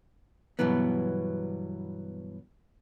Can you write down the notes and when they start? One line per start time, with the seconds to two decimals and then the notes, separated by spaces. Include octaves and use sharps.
0.59 G2 B2 E3 F#3 B3